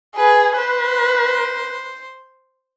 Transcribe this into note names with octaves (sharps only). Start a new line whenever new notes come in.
G#4 B4
B4 C5